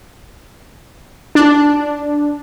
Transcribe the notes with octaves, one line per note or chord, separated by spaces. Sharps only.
D4